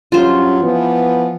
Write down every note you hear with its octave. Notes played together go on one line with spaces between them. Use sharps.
G2 F#3 C#4 F4 C5
E3 F3 B3